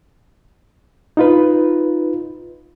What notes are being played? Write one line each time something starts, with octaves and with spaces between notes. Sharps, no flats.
D#4 F4 B4